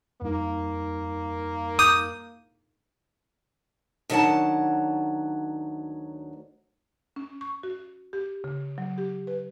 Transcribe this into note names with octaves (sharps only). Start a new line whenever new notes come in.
F2 G3 A#3 D#4
D6 D#6 G6
D2 D#3 F#3 G#4 F#5 A5
C#4
C#6
F#4
G4
C#3
F#3
G4
B4